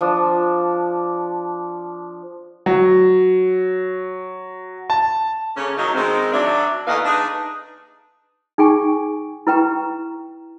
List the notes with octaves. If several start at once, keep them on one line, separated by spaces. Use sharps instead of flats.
F3 D4 D#6
F#3
A5
C#3 A3 A#3 C#4
D#3 F#3 A3 A#3 D#4
D#3 G#3 C4
F#3 D4 E5
D#2 A3 D#4 E4 B4 F5
D4 D#4 G#4 B4
D#4 G#4 G5 G#5 C#6
E4 B4 G5 A#5 C#6